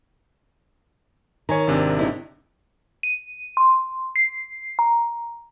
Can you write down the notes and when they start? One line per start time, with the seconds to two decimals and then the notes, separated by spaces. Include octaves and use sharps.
1.49 D#3 C#5 G#5 A#5
1.67 G#1 C3 D4
1.99 C#3 D#4 E4
3.03 D#7
3.57 C6
4.16 C7
4.79 A#5